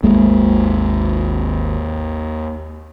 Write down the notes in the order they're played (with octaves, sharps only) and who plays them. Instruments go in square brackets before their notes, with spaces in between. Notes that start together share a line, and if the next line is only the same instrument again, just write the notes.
[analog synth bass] G#1 [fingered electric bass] D#2 G#3 A#3